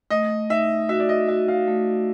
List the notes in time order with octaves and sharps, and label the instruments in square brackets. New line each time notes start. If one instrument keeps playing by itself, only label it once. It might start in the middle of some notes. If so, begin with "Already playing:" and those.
[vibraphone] A3 [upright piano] D#5
[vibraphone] D#4 [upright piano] E5
[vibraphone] F#4 [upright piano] E5
[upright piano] D5
D#5
[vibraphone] F#4 [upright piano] E5
[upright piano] F5
[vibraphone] A3